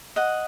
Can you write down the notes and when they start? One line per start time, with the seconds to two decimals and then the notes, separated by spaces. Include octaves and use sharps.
0.16 D#5 F#5